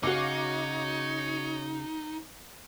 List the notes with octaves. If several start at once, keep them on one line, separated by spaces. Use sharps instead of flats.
C#3 D#4 F#4 C#5 F5 D6